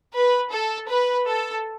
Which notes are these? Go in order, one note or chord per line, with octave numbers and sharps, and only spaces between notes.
B4
A4
B4
A4